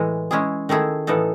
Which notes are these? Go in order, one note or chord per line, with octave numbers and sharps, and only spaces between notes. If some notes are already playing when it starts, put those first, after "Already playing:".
Already playing: A2 E3 G#3
G#3 C#4 E4 G#4
D#3 A3 E4 G#4
A2 E3 B3 D#4 A4